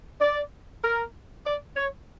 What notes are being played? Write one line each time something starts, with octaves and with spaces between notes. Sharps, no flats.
D5
A#4
D5
C#5